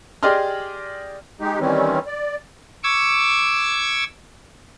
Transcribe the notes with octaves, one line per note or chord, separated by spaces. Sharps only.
G4 G#4 D5 D#5 C6 F6
G#3 D#4 G4
D#3 E3 G3 C4 C#4
D5
C#6 D6 E6 G#6